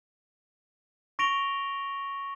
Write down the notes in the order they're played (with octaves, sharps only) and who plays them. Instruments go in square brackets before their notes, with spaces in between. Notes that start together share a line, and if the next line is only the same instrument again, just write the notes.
[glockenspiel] C#6 A#6 D7 F7 G7